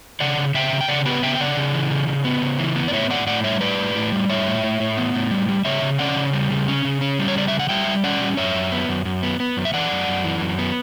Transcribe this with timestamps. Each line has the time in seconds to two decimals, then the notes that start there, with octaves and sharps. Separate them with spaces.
0.20 C#3 D5 F#5
0.37 C#3
0.54 C#3 E5 G5
0.72 C#3
0.81 G5
0.88 C#3 D5 F#5
1.06 B3 G4 B4
1.22 C#3 E5 G5
1.35 G5
1.40 C#3 D5 F#5
1.57 C#3
1.74 E3
1.91 C#3
2.08 C#3
2.24 B3
2.42 C#3
2.59 E3
2.76 B3
2.88 D5
2.92 A2 C#5 E5
3.10 A2 D5 F#5
3.27 A2 D5 F#5
3.44 G3 C#5 E5
3.61 A2 B4 D5
3.78 A2
3.95 A2
4.12 G3
4.29 A2 C#5 E5
4.47 A2
4.64 A2
4.80 A2
4.97 B3
5.15 A2
5.31 G3
5.48 G3
5.65 C#3 C#5 E5
5.82 C#3
5.99 C#4 D5 F#5
6.16 C#3
6.33 G3
6.51 C#3
6.68 C#4
6.85 C#3
7.01 C#4
7.19 G3
7.28 C#5
7.36 C#3 D5
7.48 C#3 E5
7.59 F#5
7.69 G3 E5 G5
7.87 G3
8.04 C#4 D5 F#5
8.21 G3
8.37 F#2 C#5 E5
8.55 F#2
8.72 B3
8.89 F#2
9.05 F#2
9.23 B3
9.40 B3
9.57 F#2
9.65 E5
9.74 E3 D5 F#5
9.91 F#2
10.08 F#2
10.24 E3
10.41 F#2
10.59 B3